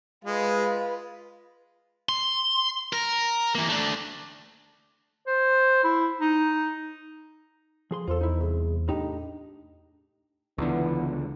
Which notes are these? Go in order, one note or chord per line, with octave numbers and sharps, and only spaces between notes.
G#3 F4 B4
C6
A#4
E3 A#3
A3 D4
C5
E4
D#4
F3 G#4 C6
E2 F4 A4 C5
D#4 E4
C2 G#4
A2 D4 D#4 G4
C#2 D3 E3 B3